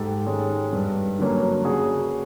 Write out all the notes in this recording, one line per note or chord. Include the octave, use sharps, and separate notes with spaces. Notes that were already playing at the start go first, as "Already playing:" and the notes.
Already playing: G#2 G4 A4
D#3 G#3 C#4
G2
D3 F#3 A#3 C#4
C#3 F#4 G#4